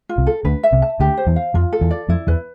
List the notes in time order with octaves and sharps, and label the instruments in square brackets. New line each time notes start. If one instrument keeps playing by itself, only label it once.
[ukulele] F4
[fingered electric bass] C2 C3
[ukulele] A4
[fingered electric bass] D2 D3 [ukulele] B4
[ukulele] E5
[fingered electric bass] C2 C3
[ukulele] A5
[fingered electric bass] D2 D3 [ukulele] G4
[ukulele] C5
[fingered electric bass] E2 E3
[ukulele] F5
[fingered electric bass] F2 F3 [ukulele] F4
[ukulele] A4
[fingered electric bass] E2 E3
[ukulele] D5
[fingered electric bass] F2 F3 [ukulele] E4
[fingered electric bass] E2 E3 [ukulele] B4